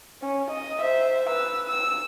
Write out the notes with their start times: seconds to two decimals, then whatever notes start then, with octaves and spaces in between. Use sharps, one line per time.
0.22 C#4
0.51 D#5
0.82 C5 E5
1.29 B4 E6
1.66 E6